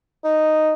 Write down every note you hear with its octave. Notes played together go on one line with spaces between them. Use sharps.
D#4